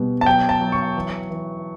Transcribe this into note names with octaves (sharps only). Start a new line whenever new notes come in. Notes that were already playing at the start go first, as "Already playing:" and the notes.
Already playing: B2 G3
A5
F#3 G5
A5
F#3
C#6
E3
E3